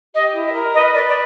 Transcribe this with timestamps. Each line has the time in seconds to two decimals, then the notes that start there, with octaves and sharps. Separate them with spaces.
0.14 G4 D#5
0.33 E4
0.44 D#5
0.54 A#4
0.73 B4 D#5
0.94 B4 D5
1.07 D5